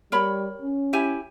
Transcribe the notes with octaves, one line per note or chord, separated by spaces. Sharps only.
G3 A#4 C#5 B5
C#4
E4 G4 G#5